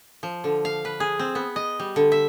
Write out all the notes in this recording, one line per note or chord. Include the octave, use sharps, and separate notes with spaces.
F3
D3
F5
B4
G#4
C4
B3
D#5
G3
D3
E5